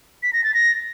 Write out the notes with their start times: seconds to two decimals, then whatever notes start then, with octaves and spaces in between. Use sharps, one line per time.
0.23 B6
0.33 A#6
0.44 A6
0.54 A#6